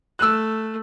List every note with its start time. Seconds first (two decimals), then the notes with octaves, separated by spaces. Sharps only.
0.19 A3 E6 F#6